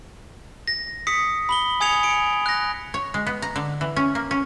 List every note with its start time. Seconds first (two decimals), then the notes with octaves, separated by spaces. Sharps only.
0.68 A#6
1.07 D#6 B6 C#7
1.49 B5 F#7 G7
1.80 G#5 D#6 G#6 C#7 F7
2.03 C#7 D7
2.46 F#6 A#6
2.94 C#5
3.14 G#3
3.27 B3
3.42 A#5
3.56 D3
3.81 E3
3.96 C#4
4.15 A#3
4.31 C#4